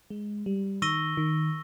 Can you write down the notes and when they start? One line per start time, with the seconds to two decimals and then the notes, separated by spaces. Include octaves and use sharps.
0.10 G#3
0.46 G3
0.82 D#3 C#6 E6 A#6 D#7 G7
1.17 D#3